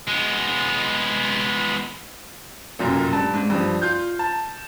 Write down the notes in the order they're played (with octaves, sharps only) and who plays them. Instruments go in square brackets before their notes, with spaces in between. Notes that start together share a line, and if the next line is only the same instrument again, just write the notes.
[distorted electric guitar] G#3 B3
[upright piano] F1 F#2 A#2
G2 A5
G#2
G2 F3
F4 G6
A5